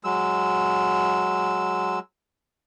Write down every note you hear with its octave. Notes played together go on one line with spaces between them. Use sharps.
F#3 G#3 E6